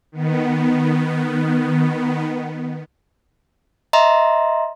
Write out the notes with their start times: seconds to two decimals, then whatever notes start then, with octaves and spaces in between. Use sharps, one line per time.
0.12 D#3 B3
3.93 D#5 E5 A#5 C6